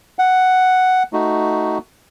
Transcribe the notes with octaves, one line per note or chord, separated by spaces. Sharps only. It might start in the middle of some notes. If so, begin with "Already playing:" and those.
F#5
A3 D#4 F#4